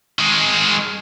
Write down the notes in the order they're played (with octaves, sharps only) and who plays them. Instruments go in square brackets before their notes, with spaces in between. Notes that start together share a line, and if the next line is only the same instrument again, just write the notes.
[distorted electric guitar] D#3 G#3